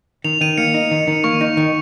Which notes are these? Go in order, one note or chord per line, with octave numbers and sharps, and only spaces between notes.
D#3 F7
D#3 D#7
A#3 C#7
D#4
D#3
D#3
A#3 C#6
D#4
D#3